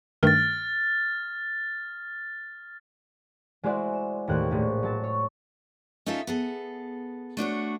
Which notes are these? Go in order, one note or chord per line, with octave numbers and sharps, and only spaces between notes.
G2 D#3 A3 F6 A6
G#3 E4 F#4 C5 D5 F#5
E7
D#2 A2 C5 F#6
A#1 A2
F#3 A5 E7
C#5
C#4 D#4 F4 A4 E5
B3 G#4 A4
A3 D4 F#4 C#5